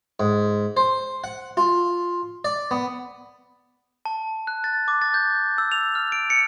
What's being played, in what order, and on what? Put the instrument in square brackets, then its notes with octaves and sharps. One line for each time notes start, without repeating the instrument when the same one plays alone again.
[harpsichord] G#2
C5
F#5
F4
D5
B3
[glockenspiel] A5
F#6
A6
D6
A6
G6
E6
F7
F6
D7
C#7